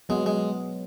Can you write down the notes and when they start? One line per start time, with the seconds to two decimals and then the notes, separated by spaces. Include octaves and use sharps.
0.09 F#3 G#3 B3
0.26 G#3